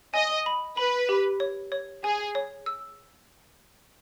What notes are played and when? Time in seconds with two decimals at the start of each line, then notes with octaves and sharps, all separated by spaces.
0.14 D#5 G#5
0.46 B5
0.77 B4 B5
1.09 G4
1.40 C#5
1.72 C#5
2.04 G#4 G#5
2.35 C#5
2.66 E6